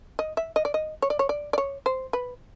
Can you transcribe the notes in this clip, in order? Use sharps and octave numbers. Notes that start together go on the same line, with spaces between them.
D#5
E5
D#5
D5
D#5
C#5
D5
C#5
D5
D5
C#5
C5
B4